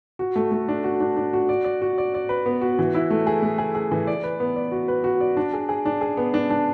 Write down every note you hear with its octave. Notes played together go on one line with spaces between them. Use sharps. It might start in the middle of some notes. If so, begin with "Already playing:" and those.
F#4
A3
A3
D4
F#4
D4
D4
F#4
D5
D5
F#4
D5
D5
B4
B3
F#4
E3
E4
A3
G#4
A3
G#4
G#4
E3
D5
B4
B3
D5
F#4
B4
F#4
D5
D4
G#4
G#4
D4
G#4
B3
D4
D4